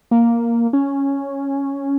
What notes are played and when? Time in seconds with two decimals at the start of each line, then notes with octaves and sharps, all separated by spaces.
0.11 A#3
0.73 C#4